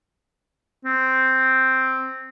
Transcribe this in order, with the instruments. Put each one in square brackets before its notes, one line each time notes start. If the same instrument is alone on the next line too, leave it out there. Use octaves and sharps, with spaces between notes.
[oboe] C4